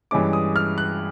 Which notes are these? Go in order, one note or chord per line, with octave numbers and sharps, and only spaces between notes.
G2 E3 G#3 C#4 D6
D#6
F6
F#6